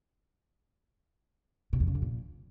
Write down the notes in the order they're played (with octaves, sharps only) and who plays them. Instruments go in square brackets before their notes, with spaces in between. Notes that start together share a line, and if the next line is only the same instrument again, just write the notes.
[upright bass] B2
E2
C#3
F2
A#2